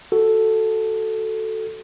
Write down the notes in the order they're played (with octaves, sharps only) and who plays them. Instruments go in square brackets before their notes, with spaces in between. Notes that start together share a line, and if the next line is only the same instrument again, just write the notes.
[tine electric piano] F#4 A4